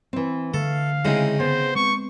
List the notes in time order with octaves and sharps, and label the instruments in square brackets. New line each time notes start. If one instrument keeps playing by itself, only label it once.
[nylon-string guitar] E3 C4
[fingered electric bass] D3 [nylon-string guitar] A3 [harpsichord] A4 [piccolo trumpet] F5
[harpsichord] C#3 C4 D#4 [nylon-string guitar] G#3 E4 G#4
[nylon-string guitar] B3 [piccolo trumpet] C5
[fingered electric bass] G#3 C4 [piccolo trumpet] C#6